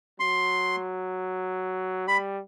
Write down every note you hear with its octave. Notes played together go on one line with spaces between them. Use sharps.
F#3 C6
G3 B5